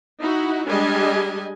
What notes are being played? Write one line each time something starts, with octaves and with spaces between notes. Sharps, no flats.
D#4 E4 F#4 F#5
G3 G#3 D4 G4 D#5 G#5